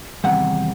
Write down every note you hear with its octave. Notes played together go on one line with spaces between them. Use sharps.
E2 C3 D#3 G3 F#5